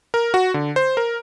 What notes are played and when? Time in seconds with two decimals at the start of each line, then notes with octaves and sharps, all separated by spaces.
0.14 A#4
0.34 F#4
0.54 D3
0.76 C5
0.97 A#4